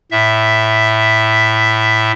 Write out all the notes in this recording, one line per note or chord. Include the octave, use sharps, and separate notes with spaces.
A2 E5